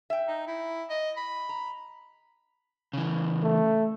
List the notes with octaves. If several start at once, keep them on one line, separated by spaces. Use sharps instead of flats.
E5 G5
D#4
E4
D#5
B5
A#5
C#3 E3
A3